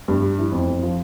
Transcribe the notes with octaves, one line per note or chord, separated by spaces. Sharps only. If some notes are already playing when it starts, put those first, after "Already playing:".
G2
G3
E3
F2
F2
F3